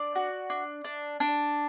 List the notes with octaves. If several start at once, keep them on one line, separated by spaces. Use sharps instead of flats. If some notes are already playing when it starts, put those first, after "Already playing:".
Already playing: D4 D5
F#4
D4
D4
D4